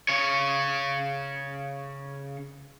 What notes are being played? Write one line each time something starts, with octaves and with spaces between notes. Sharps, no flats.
C#3 C#5